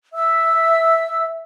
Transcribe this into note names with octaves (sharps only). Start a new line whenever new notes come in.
E5 E6